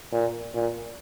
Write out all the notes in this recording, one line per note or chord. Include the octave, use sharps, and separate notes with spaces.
A#2
A#2